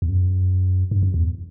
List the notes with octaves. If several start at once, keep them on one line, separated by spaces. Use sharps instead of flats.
E2
F#2
G2
F#2
E2